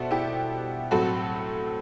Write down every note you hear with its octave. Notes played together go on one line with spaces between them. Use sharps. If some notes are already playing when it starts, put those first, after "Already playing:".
Already playing: B2 D4 F#4 A4 C5 E5
E4 G4
A2 F#3 A3 C4 F#4 A4